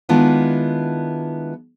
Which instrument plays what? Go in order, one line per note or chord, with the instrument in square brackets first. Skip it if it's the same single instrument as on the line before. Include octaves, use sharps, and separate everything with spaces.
[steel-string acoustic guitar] D#3 G#3 B3 D4 E4 F4